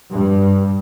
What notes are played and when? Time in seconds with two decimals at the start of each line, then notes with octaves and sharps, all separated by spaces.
0.14 G2